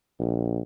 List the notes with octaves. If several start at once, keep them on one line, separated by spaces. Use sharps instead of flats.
A#1